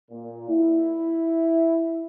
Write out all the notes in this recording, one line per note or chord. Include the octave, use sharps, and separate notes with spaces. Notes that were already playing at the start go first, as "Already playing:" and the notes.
A#2
E4